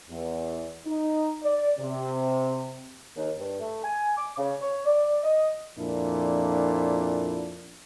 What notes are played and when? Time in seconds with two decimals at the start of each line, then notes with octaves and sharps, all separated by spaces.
0.10 E2
0.86 D#4
1.43 D5
1.79 C3
3.17 D#2
3.39 G2
3.60 A3
3.84 G#5
4.17 D6
4.38 C#3
4.62 C#5
4.86 D5
5.24 D#5
5.77 F2 A#2 D4 E4